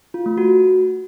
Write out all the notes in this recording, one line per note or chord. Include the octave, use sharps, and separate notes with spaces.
F4
A3
F#4